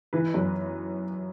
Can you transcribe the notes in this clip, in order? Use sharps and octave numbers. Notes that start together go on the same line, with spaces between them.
E3 B4
F#2